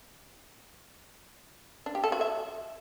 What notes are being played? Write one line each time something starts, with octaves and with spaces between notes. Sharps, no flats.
D4
G4
A4
F#4
E5